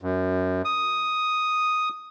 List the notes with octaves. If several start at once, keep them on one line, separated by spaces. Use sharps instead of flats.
F#2
D#6